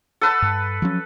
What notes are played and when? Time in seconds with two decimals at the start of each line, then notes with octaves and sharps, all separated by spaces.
0.21 A4 B4 A5
0.42 G2
0.82 F3 F#3 C#4